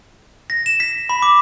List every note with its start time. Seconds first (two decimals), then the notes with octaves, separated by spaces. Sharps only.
0.50 A#6
0.66 E7
0.80 B6
1.09 B5
1.22 D6